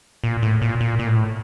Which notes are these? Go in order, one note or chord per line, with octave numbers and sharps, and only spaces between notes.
A#2
A2
A#2
A#2
A#2
A2